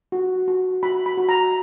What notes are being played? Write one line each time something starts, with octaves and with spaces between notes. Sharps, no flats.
F#4
F#4
F#4 B5
B5
F#4
A#5